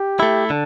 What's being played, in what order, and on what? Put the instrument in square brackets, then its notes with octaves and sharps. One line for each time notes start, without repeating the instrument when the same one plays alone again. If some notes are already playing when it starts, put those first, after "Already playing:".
Already playing: [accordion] G4
[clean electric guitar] A3 E4
[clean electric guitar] D3 [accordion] A4